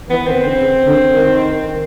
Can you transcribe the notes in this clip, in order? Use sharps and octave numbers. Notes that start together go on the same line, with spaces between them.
E3 B3
D#3 C4
D3 C4
C#3
D3
D#3
D#3